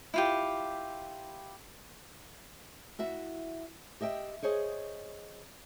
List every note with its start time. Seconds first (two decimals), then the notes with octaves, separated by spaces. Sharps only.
0.14 E4 F4 G4
2.99 E4 F#4 E5
4.00 G4 D#5 E5 G5
4.43 G#4 C5 C#5 D#5